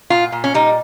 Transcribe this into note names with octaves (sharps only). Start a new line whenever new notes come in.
A#2 F4
A#2
C#4
G3 D#4